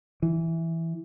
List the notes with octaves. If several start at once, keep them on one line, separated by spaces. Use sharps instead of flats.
E3